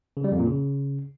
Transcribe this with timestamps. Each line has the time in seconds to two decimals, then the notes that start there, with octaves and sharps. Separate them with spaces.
0.17 C#3
0.24 G3
0.32 F2
0.39 A#2
0.47 C#3